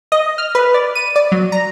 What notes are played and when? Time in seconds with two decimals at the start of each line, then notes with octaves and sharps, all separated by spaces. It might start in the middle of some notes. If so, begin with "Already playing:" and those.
0.12 D#5
0.38 F6
0.55 B4
0.74 D5
0.95 D#7
1.16 D5
1.32 F#3
1.52 A#5